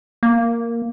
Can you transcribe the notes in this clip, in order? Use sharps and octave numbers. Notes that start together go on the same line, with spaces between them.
A#3